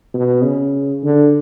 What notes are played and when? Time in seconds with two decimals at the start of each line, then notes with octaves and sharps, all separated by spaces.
0.14 B2
0.44 C#3
1.03 D3